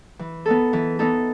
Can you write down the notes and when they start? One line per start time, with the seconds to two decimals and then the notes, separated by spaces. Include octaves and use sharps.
0.19 E3
0.46 B3 D#4 A4
0.73 E3
0.99 B3 D#4 A4